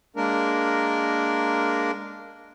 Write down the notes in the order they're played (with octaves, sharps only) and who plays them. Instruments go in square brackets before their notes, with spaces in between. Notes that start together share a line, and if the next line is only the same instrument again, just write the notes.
[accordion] G#3 A#3 D4 A#4